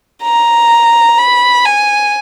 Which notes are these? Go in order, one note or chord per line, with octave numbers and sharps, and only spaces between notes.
A#5
B5
G#5